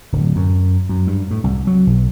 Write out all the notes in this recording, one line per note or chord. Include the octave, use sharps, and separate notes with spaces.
D1
F#2
F#2
G2
A2
C2
F#3
B1